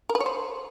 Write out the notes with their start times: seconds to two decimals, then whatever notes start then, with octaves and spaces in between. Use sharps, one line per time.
0.09 A#4
0.15 B4
0.20 C#5
0.26 C5